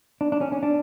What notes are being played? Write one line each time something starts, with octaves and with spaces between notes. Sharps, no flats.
D4
D4
C#4
C#4
D4